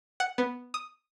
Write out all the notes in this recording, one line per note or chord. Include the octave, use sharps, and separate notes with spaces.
F#5
B3
D#6